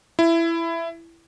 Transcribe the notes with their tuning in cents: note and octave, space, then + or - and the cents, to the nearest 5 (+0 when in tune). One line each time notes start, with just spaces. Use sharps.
E4 +15